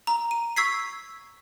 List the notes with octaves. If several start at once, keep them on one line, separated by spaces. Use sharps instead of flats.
A#5
D#7
C#6 E6 G#6 B6 C7